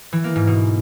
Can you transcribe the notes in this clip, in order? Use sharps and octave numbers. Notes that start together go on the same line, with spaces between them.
E3
A#3
G#2
B2